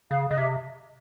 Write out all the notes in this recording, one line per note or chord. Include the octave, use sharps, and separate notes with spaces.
C#3 F5
C#3 D#5
C3 E5